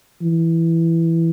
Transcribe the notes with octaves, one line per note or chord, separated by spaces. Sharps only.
E3